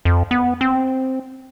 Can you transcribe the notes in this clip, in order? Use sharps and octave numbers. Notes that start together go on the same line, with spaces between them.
F2
B3
C4